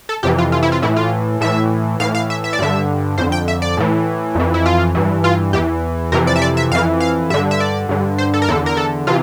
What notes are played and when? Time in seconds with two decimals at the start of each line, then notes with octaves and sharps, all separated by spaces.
0.09 A4
0.23 F2 C3 E3 G4
0.38 F4
0.52 F4
0.63 E4
0.72 F4
0.82 A2 E3 E4
0.96 F4
1.41 A2 E3 E5
2.00 A2 E3 F5
2.15 F5
2.30 E5
2.44 E5
2.53 D5
2.59 G2 D3 E5
3.18 F2 D3 C5
3.32 G5
3.48 E5
3.62 D5
3.77 A2 E3
4.35 F2 E3
4.54 E4
4.66 F4
4.95 G2 E3
5.24 F4
5.53 E2 E3 G4
6.12 F2 C3 E3 A#4
6.27 D5
6.36 E5
6.42 D5
6.57 E5
6.71 F2 E3 F5
7.00 F5
7.30 G2 D3 E5
7.51 E5
7.60 D5
7.89 G2 D3
8.18 C5
8.34 A4
8.42 A#4
8.49 E2 D3 A4
8.66 A#4
8.77 A4
9.07 C3 E3 F4